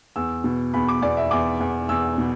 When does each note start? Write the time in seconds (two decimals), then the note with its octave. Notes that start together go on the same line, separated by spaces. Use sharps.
0.16 E2 E6
0.44 B2
0.74 E2 B5
0.88 D6
1.02 E2 D5
1.17 E5
1.31 E2 D6
1.60 E2
1.89 E2 E6
2.18 B2